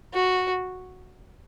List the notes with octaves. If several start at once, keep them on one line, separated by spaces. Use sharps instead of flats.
F#4